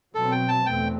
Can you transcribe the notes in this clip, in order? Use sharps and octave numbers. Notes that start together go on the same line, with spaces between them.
B2 F#3 C4 A4
G5
A5
E2 B2 A3 C4 G5